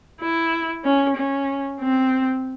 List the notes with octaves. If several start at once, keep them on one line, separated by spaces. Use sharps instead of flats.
E4
C#4
C#4
C4